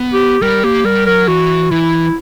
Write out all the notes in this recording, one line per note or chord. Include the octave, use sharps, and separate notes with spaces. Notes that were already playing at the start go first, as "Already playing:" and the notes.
Already playing: B3
G4
G3 A#4
A#3 G4
G3 A#4
F#3 A#4
E3 F#4
E3 E4